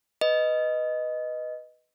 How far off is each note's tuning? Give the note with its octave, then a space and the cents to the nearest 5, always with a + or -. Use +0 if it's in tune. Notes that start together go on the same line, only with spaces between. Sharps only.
B4 +0 D#5 +0